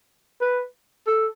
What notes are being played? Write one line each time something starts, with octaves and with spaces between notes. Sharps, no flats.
B4
A4